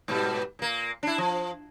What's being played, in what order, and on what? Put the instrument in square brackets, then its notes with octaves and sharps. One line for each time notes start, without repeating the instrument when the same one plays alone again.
[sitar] G#2 B2 G3
A#2 A#3
D4 E4
F3